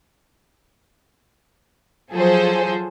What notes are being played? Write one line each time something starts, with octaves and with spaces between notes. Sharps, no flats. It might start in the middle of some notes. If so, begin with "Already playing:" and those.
F3 F#3 G#4 A4 C5